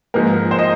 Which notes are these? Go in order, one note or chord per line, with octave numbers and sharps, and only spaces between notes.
G#2 F3 A#3 A#4
C5
D#5